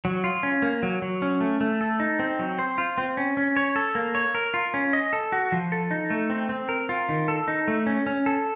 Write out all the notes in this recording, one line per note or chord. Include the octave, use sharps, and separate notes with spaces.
F#3
F4
C#4
A#3
F#3
F#3
C#4
A3
A3
A4
D#4
C4
F#3
C5
F4
C4
C#4
C#4
C#5
A4
A#3
C#5
A#4
F4
C#4
D#5
A4
F#4
F3
A4
D#4
A3
C4
C4
A#4
F4
D#3
A4
D#4
A3
C#4
C#4
A4